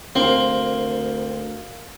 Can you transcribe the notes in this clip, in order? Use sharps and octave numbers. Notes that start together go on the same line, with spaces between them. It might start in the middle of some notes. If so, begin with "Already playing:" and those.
D2 A#3 C4